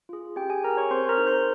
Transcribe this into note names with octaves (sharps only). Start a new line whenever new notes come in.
F4 G#4
C#4 G4 G5
G#4 G#5
G4 A#4 A#5
C#5 C#6
C4 C5 C6
A#4 A#5
D#4 G#4
C5 C6